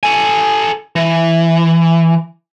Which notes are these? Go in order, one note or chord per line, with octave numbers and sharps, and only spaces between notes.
A4 G#5
E3